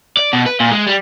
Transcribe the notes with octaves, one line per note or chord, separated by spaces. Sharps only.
D5
B2
B4
A#2
G#3
G3